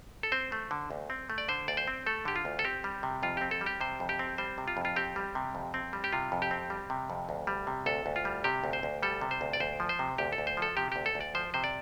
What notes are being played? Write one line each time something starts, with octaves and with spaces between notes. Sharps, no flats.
A4
C4 C5
A3
D3
D2
C4
A3
D5
D3 C5
D2 D5
C5
C4
A3 A4
D3 G4
F4
D2
A4
C4 G4
G3
C3
F2 F4
C4 G4
A4
G3
G4
C3 C5
F2
G4
C4
G3 C5
C3
F4
F2
F4
C4 G4
G3
C3
F2
C4
G3
G4
C3 F4
F2
G4
C4
G3
C3
F2
D2
G3
C3
D2 A4
D2
F4
G3
C3 G4
D2
C5
D2
G3 A4
C3
C5
D2
D5
D2 C5
F3
C5
C3
D2 G4
A4
D2
C5
F3 A4
C3 G4
D2 G4
A4
D2
D5
F3 C5
C3 C5
D5